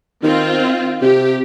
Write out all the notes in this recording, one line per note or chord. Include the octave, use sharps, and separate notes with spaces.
D#3 C4 F4
C3 G4